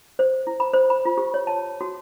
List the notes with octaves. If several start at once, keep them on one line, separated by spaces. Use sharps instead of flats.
C5
E4
B5
C5
B5
F4
G4
C#5
A5
F#4